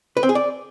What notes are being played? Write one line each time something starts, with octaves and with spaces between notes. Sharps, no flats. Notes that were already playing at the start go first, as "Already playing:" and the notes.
B4
C4
G#4
D5